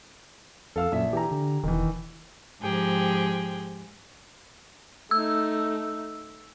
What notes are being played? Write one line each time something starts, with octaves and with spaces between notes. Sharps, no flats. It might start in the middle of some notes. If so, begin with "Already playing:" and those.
F2 A4 F5 E6
A#1 F#2 E5
E3 G4 G#5 A#5
D3
E1 D#3 E3
G#2 F3 G4 G#4 G5
A3 D#4 E6